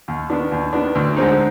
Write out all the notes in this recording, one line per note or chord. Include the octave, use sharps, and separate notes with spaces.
D#2
D#3 B3 D4
D#2
D#3 B3 D4
D2
D3 G#3 C4 D#4